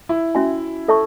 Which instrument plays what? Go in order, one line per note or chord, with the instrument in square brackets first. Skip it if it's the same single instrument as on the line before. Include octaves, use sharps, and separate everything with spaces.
[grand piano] E4
[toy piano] C#4 F#4 C#5 E5 G#5
A4 C#5 E5 A5 C#6